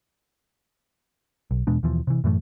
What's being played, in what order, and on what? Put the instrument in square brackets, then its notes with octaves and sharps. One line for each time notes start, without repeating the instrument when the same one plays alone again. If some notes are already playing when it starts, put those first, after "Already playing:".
[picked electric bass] B1
E2 B2 G#3 D4
D#2 B2 E3 F3
C3 E3
F#2 A2 E3 A3